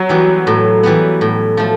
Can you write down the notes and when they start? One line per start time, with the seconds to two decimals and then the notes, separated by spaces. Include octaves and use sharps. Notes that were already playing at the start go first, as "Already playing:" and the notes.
Already playing: F#3
0.09 E3 G3 B3
0.47 A2
0.83 E3 G3 B3
1.21 A2
1.57 F3 A3